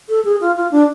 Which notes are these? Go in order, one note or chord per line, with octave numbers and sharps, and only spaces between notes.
A4
G#4
F4
F4
D4